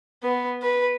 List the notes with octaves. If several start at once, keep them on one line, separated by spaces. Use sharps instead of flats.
B3
B4